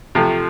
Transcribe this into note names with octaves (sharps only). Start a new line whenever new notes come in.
C3 F3 A3